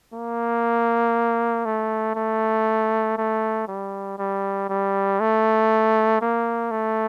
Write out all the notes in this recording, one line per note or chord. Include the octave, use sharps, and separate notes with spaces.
A#3
A3
A3
A3
G3
G3
G3
A3
A#3
A3